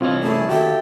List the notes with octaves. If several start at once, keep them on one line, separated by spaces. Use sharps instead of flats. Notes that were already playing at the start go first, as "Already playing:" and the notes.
C2 E3 C4 F4 C#5 D#5
A3 C#4 E4 G#4 A5
D#2 F#4 G4 A4 E5 G5